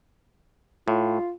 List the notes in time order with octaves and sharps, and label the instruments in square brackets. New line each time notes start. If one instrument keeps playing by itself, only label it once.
[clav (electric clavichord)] A2 [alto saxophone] F4